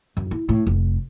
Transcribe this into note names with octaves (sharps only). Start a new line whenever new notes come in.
F#2
E4
A2
F1